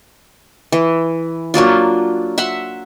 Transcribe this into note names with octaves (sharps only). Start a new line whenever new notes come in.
E3
F#3 A#3 D4 F4
E5 F#5 C6